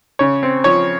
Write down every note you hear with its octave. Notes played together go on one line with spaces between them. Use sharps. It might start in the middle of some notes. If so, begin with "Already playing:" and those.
C#3 C#5
C4
F3 C#5